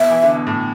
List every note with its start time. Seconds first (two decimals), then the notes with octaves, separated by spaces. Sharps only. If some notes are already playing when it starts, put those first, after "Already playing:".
Already playing: B2 E5
0.10 E3
0.23 D3
0.34 B2
0.47 A2